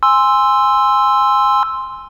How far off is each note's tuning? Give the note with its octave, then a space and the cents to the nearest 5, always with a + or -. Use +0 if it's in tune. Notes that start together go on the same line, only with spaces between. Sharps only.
G#5 -10 C6 +0 E6 +0